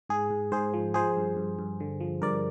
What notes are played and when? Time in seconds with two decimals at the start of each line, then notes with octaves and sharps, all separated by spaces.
0.09 G#2 G#4
0.31 G#2
0.52 G#2 G#4 C5
0.74 F3
0.94 F3 G#4 C5
1.17 G2
1.37 G2
1.59 G2
1.80 D3
2.00 F3
2.22 G2 A#4 D5